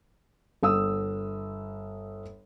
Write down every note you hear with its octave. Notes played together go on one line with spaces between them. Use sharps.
G1 D#6 E6